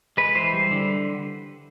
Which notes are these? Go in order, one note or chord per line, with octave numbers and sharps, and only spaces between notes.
G#3 B4
E3 C5
G3
D3